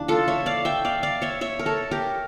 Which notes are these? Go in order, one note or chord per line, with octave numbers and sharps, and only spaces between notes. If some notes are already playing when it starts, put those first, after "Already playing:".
Already playing: C#3 E3 G3 A#3 D4
F4 A4
C#5 E5
D5 F5
E5 G5
D5 F5
D5 F5
C#5 E5
C#5 E5
A#4
A4 C#5
G4 A#4